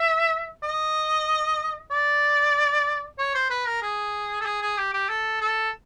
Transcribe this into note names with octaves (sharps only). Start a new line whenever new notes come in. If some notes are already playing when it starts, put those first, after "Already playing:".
Already playing: E5
D#5
D5
C#5
C5
B4
A#4
G#4
A4
G#4
G#4
G4
G4
A4
A4